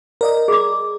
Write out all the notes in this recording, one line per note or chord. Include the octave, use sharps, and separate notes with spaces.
A#4 D5 D#5
G#4 D6